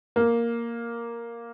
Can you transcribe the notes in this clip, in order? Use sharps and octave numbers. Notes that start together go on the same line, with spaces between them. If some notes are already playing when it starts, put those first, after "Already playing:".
A#3